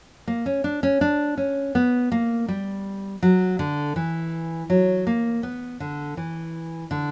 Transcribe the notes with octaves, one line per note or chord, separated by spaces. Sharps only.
A#3
C#4
D4
C#4
D4
C#4
B3
A#3
G3
F#3
D3
E3
F#3
A#3
B3
D3
E3
D3